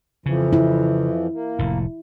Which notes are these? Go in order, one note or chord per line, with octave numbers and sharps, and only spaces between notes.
F2 C#3 E3 F3
E4
A#3
F1 A2